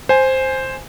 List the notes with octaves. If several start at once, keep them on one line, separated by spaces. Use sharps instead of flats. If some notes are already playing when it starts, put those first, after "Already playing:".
C5 G#5